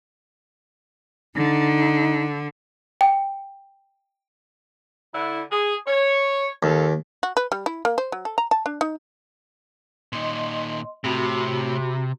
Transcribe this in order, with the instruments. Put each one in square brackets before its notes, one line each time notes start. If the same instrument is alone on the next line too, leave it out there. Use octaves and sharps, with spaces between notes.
[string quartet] D3 [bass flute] D#4
[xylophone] G5
[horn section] D3 E4
G#4
C#5
[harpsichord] D#2 [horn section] F4 G#4 A4
[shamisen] F#4
B4
G3
E4
A#3
C5
F#3
A4
A#5
A5
D4
D#4
[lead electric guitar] A#2 D#3 [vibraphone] D#5 C6
[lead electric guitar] A2 [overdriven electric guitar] C3 [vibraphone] F#4 B5